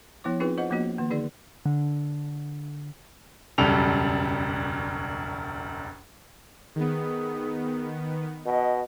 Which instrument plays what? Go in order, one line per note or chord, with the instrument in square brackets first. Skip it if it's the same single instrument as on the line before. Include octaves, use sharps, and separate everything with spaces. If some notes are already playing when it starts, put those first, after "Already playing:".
[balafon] F3 B3 E4 C#5 D6
C4 D#4 F4 G#4 B4
F4 C5 D#5 F#5
F3 A#3 B3 D4 F#4 D#5
D#3 A#3
D3 D#4 G#4 D5
[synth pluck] D3
[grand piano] E1 C#2 F#2 G3 A4 F7
[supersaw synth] D#3 B3 [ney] G#4
[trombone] B2 [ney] D#5